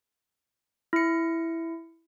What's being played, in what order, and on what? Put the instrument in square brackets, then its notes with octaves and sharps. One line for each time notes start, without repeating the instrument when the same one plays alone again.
[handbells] E4 C#7